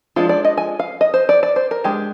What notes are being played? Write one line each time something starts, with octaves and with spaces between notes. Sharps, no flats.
F3 G#3 D4 F4
D5
D#5
G#5
F5
D#5
C5
D5
D5
C5
A#4
G#3 D4 G4